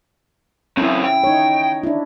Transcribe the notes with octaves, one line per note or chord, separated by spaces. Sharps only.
F#3 C4 C#4 E4
G5
D#4 C#5
D4 E4